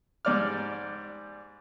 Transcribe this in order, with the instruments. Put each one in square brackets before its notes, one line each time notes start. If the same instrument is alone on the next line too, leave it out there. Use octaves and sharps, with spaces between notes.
[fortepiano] G#2 G3 D5 D6 F6